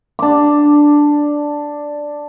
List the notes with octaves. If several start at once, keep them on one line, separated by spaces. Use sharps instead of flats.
D4 D6